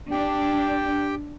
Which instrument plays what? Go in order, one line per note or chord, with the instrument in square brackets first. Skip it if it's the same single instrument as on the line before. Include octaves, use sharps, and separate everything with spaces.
[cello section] D4 [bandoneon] G4 G5